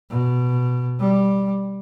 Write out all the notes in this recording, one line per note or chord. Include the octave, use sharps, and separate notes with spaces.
B2
G3